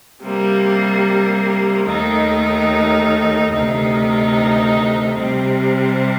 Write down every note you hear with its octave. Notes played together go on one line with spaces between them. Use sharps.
C3 G3 A#3
D#2 D#3 A3 D#4
D2 C3 D#3 A3 D#4
C3 G3 C4